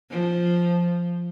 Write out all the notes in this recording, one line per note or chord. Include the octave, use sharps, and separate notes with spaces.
F3